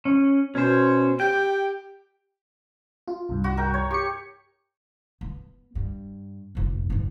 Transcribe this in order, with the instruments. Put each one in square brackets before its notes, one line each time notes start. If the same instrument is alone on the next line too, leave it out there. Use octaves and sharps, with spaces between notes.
[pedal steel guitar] C#4
[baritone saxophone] B2 [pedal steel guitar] C#4 C5
[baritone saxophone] G4 [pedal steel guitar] G5
[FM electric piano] F4
C2 G2
[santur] F#4
A#4 G5
C#5
[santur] G4 [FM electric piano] C#6 C#7
[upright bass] B3
G2
F1 A#1
G1 E2